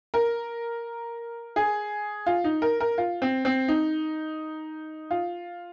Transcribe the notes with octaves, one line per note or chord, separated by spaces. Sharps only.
A#4
G#4
F4
D#4
A#4
A#4
F4
C4
C4
D#4
F4